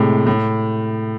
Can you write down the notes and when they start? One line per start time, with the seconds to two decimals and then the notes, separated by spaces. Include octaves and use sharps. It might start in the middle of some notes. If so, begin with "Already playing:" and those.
Already playing: A2 C3 G#3
0.27 A2